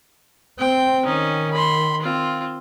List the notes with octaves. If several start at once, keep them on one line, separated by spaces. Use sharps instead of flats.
C4 G5
D#3 C#4 D#4
B5 C6
C4 F4